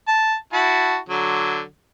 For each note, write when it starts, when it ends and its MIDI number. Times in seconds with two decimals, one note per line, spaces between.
0.08 0.36 81
0.53 0.97 64
0.53 0.97 66
0.53 0.97 81
1.09 1.62 50
1.09 1.62 54